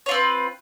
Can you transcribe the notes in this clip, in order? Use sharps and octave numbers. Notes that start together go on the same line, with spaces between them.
C4 F4 B4 C#5